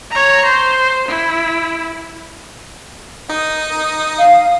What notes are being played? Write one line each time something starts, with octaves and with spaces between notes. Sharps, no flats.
C#5 A#5
C5
E4
D#4 D#6
F5